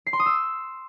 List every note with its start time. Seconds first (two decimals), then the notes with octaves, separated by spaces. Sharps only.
0.07 C7
0.13 C6
0.20 D#6
0.26 E6